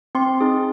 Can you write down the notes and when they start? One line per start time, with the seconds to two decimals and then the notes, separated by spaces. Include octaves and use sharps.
0.15 C4 C6
0.40 D#4 G#4